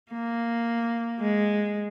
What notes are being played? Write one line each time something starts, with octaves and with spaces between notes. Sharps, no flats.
A#3
G#3